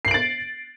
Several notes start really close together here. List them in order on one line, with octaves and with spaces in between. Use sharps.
C7 F#7 D7 A6